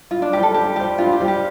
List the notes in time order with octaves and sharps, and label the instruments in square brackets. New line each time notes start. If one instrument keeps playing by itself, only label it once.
[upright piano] G2 [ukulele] F4
[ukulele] D4
[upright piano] G3 F4 C5 [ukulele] G4
[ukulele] A4
[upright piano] G2 [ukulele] G4
[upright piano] G3 F4 C5 [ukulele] G4
[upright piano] G2 [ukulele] F4
[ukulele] G4
[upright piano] G3 F4 C5
[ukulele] G4